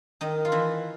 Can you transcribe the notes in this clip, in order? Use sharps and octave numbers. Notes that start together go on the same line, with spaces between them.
D#3 D#4
F4
E3 E4